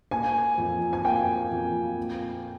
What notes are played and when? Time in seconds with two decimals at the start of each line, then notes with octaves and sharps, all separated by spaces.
0.11 A#3 G#5
0.58 F2
0.93 G#5
1.05 A#3 G5
1.51 F2
1.97 A#2